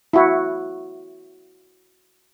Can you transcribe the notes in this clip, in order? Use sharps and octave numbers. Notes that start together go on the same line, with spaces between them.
E4 F#4